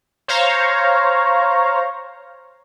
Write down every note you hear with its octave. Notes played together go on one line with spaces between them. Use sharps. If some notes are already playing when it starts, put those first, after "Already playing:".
C5 C#5 F5 A#5